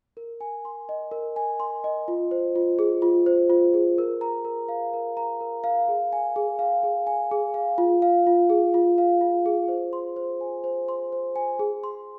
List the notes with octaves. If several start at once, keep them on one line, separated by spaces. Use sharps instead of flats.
A#4
G#5
C6
D#5
A#4
G#5
C6
D#5
F4
C5
F4
G#4
F4
C5
F4
G#4
A#4
A#5
A#4
F5
A#4
A#5
A#4
F5
G#4
G#5
G#4
F5
G#4
G#5
G#4
F5
F4
F5
F4
G#4
F4
F5
F4
G#4
C5
C6
C5
G#5
C5
C6
C5
G#5
G#4
C6